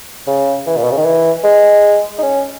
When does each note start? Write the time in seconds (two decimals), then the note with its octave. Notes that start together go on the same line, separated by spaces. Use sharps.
0.27 C#3
0.66 E3
0.76 A#2
0.84 B2
0.91 C#3
0.97 D#3
1.04 E3
1.44 G#3
2.18 D#4
2.22 C#4